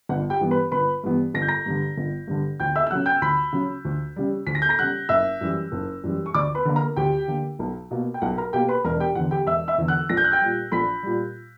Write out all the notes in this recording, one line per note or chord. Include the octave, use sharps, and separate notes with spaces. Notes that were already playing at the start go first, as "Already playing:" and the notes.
G1 F#5
G4 G5
G2 E3 B3
B4 B5
G1 B4 B5
G2 E3 B3
G1 A#6
G6
A#5 A#6
G2 D3
G1
G2 D3
D2 G5 G6
E5 E6
E6
C#3 F#3 F#5 F#6
G5 G6
D2 B5 B6
C#3 F#3
D2
C#3 G3
D2 B6
A#6
G6
A#5 A#6
C#3 G3 F#5 F#6
F#1 E5 E6
F#2 E3 G3
F#1
F#2 E3 G3
C#6
D2 D5 D6
B4 B5
D3 A#3
A#4 A#5
D2 G4 G5
D3 A#3
B1
B2 A#3
G5
B1 F#5
A#4 A#5
B2 A#3 G4 G5
B4 B5
E1 A#4 A#5
G4 G5
E2 D3 F#5
G4 G5
E1 E5 E6
E5 E6
E2 D3
F#5 F#6
A#1 A#6
G6
F#6
G5 G6
A#2 G3
A#1 B5 B6
A#2 G3